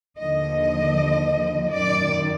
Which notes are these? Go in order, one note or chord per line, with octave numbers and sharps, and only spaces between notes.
D#2 D3 F3 D#5
F#2 D#3 D5